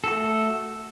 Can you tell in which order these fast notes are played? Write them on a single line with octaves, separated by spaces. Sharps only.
A4 F#4 A3